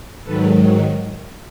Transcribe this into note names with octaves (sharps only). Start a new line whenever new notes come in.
G#2 D#3 F#3 A4 B4